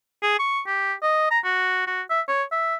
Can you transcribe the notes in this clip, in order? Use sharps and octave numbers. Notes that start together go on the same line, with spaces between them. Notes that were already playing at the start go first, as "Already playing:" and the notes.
G#4
C#6
G4
D#5
A#5
F#4
F#4
E5
C#5
E5